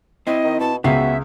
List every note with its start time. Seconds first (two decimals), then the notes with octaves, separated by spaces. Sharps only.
0.27 C4 E4 D#5
0.44 D#3
0.60 B2 A5
0.84 C#2 B3 C#4 F#4 E5 C7